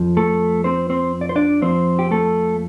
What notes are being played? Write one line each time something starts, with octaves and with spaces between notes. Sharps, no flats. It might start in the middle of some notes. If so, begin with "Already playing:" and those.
Already playing: F2 F3
A3 A4
C4 C5
C4 C5
D5
C5
D4 D5
F2 F3 C4 C5
G4
A3 A4